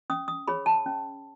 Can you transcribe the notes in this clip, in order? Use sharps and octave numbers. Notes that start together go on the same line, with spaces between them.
C#4 D#6
D#6
G#4 C#5 B5
A5
C#4